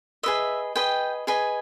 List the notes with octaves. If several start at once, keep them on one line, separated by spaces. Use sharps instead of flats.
G#4 B4 D#5 E5
G#4 B4 D#5 G5
G#4 B4 D#5 G#5